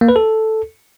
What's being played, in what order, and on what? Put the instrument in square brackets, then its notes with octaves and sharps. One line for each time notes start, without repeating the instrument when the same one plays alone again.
[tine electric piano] A#3
B4
A4